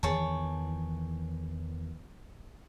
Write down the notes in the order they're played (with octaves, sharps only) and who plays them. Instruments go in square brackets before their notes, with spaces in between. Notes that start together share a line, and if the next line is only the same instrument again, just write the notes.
[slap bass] E2 D#3 E3 [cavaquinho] G#4 C#5 A5